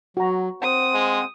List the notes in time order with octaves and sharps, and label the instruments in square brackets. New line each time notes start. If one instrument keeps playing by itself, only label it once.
[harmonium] F#3 [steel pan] F#4 A#5
[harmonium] C4 C5 F#5 [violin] D#6
[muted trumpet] G#3